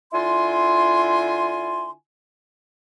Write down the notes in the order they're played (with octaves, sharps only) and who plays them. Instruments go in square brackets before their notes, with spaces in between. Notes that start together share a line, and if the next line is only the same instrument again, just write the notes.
[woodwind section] D3 E4 F4 G#5 C6